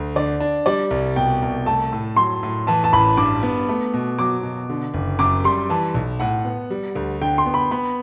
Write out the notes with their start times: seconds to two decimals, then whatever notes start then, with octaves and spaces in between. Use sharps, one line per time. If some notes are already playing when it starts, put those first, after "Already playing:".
Already playing: D2
0.16 D3 D5
0.40 D4
0.66 G3 D5
0.91 C2
1.16 B2 G5
1.42 C2
1.66 A3 A5
1.92 A2
2.16 F#3 C6
2.43 A2
2.67 E3 A5
2.84 A5
2.93 A1 B5
3.17 G2 D6
3.43 B3
3.69 A3
3.94 B2
4.19 F#3 D6
4.43 B2
4.70 D3
4.94 F#1
5.19 F#2 D6
5.44 G3 C6
5.70 E3 A5
5.94 B1
6.20 A2 F#5
6.45 B3
6.70 G3
6.96 D2
7.21 D3 G5
7.38 C6
7.46 B3
7.54 B5
7.71 B3 B5